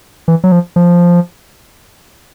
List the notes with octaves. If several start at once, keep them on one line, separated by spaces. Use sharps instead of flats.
E3
F#3
F3
F3